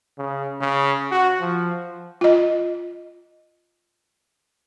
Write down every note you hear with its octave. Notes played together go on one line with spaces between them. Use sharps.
C#3
C#3
F#4
F3
F4 D#5